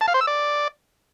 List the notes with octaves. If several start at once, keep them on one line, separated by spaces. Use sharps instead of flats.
A5
F5
C5
E6
D5